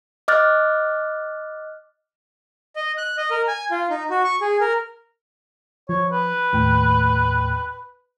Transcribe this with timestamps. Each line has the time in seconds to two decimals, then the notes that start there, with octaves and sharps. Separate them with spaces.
0.28 D#5 D6 F6 F#6 A6
2.76 D#5
2.98 F#6
3.17 D#5
3.31 A#4
3.48 G#5
3.71 F4
3.90 D#4
4.10 F#4
4.24 C#6
4.41 G#4
4.61 A#4
5.89 F3 C#5
6.11 B4
6.53 D#2 A2 G5